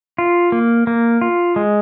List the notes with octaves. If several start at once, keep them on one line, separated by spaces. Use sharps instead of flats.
F4
A#3
A#3
F4
G#3